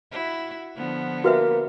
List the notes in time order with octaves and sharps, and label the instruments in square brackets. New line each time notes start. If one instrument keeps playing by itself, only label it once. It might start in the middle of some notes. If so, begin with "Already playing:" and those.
[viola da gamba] E4 F#4
D3 F3 B3
[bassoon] A#3 [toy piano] F#4 B4 E5